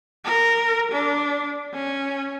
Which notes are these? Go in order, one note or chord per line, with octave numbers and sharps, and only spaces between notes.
A#4
D4
C#4